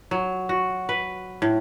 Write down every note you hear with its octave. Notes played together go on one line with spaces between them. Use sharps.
F#3
F#4
B4
A2